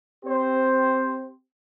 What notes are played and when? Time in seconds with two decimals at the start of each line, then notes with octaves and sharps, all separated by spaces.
0.24 C4 G4 C5